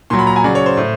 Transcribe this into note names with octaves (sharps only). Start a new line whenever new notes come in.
A#2 F#3 C6
B5
A#5
G#5
C#3 F#3 D5
C#5
C5
A2